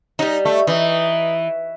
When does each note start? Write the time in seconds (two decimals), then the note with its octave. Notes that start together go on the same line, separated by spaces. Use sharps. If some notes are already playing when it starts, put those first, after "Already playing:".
0.19 F#3 G3 D#4
0.45 A3
0.67 E3 D#4